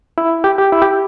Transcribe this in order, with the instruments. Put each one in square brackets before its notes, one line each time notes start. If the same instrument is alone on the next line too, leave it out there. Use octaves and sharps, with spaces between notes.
[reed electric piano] E4
G4
G4
E4
G4